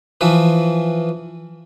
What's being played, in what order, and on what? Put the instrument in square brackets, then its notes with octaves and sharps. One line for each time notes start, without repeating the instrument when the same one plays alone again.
[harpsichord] E3 F3 B4